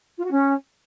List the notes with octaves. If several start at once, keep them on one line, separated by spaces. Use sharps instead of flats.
F4
F#4
C#4